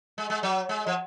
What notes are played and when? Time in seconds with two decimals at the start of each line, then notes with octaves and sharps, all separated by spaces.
0.18 G#3
0.30 G#3
0.43 F#3
0.69 G#3
0.87 F3